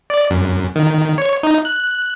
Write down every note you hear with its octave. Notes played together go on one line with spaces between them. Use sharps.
D5
F#2
D#3
C#5
D#4
F#6